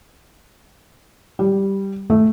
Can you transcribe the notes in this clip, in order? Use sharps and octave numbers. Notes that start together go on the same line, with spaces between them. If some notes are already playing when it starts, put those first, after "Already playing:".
G3
A3